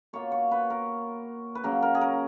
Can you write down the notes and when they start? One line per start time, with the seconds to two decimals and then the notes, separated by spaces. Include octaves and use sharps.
0.13 B2 A#3 F4 C#5
0.32 C#5
0.51 B4
0.70 A#4
1.55 B4
1.64 C#3 F#3 A#3 C#4 A#4
1.82 A#4
1.95 G#4
2.01 A#4